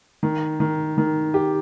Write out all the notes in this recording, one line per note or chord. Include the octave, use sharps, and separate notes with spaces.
D#3
D#3
D#3
G4